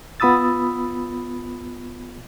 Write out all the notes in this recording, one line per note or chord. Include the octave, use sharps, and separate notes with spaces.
B3 F4 B5 D#6 E6 A6